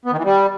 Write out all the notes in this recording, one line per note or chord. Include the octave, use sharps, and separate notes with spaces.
B3
D#3
E3
G3